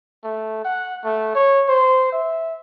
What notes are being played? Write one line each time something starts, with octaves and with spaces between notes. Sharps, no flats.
A3
F#5
A3
C#5
C5
E5